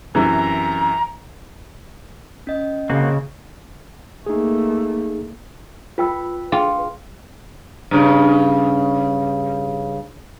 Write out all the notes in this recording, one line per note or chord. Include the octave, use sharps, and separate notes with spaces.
F#2 C3 E3 A#5
C#4 D#5
C#3 A#3 C4 F#4
A3 A#3 D#4 G#4
F4 B4 G5 E6
F4 G#4 G5
G2 C#3